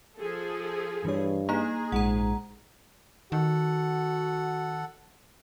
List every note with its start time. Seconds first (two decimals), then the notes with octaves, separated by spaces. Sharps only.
0.17 F3 G#4 A4
1.05 G2 E3 C#5
1.49 A#3 D#4 G#4 A#5
1.92 A#1 G#2 G#3 F#5 A#5
3.32 D#3 F#4 A4 F#5